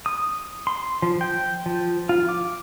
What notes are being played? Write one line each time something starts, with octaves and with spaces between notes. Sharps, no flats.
D#6
C6
F3
G5
F3
F4
D6